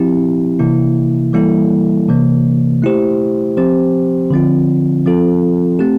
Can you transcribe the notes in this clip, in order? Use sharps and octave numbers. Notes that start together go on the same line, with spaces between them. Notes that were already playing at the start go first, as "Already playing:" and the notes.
Already playing: F3 C4 E4 G4
C3 E3 A#3 E4
E3 G3 A#3 E4 A4
C3 E3 A#3
A3 E4 G4 C5
F3 C4 G4 C5
D3 F3 C4 F4
F3 C4 F4 A4
A3 C4 G4